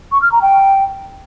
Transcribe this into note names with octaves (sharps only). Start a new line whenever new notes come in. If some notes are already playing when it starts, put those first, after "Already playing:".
C#6
F6
A#5
G5